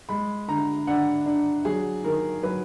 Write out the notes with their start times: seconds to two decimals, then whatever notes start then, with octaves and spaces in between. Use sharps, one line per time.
0.09 G#3 B5
0.48 D3 A#5
0.87 D4 F#5
1.26 D4
1.65 F#3 G#4
2.04 D#3 A#4
2.43 F#3 B4